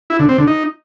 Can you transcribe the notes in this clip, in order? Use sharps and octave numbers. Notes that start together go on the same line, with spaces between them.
E4
D3
C4
D3
D#4